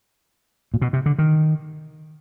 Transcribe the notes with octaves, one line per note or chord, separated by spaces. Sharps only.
A#2
B2
C3
D3
D#3